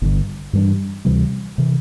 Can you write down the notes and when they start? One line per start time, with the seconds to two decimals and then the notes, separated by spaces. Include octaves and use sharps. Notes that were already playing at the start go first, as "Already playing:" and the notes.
0.02 G1 G2 D3
0.53 G2 E3 G3 D4
1.05 D2 C3 E3 G3
1.58 C3 E3